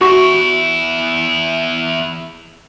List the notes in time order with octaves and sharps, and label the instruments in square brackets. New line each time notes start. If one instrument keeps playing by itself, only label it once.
[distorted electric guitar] E2 E4 [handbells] F#4 C#6